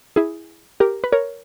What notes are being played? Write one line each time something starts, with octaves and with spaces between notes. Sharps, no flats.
E4 G#4
G4 A#4
B4
A#4 C#5